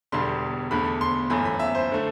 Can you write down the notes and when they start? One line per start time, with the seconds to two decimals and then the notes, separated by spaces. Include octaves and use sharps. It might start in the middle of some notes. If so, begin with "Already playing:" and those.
0.12 E1 E2 D3 G3 C6
0.71 E2 D3 A3 B5
1.01 C6
1.30 G1 F#2 E3 A3 B5
1.45 B5
1.59 E5
1.75 C5
1.92 D3 A3